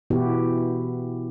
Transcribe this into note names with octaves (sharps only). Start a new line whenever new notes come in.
B2 E3 B3 E4 F#4 G4